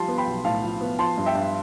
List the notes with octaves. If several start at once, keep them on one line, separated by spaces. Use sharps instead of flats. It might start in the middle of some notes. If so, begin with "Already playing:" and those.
Already playing: F3 G3 A5 C6
B3
G5 B5
B1
A2 F5 A5
F3
B3
F3 A5 C6
G2
E5 G5
G2